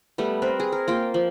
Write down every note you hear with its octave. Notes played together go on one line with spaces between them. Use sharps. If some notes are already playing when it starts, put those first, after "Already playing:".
G3 A3 B3
C4 A#4 B4
G#4
A#4
A#3 F4 G5
F3